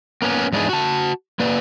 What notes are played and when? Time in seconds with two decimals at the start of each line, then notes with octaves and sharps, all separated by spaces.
0.22 A#3 B3 C#4
0.52 E2 G#2 D4 E4 G#4
0.69 F#4 A5
1.40 A#3 B4 D5